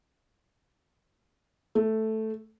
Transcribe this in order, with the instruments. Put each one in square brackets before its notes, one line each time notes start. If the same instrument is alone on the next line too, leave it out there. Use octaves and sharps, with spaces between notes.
[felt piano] A3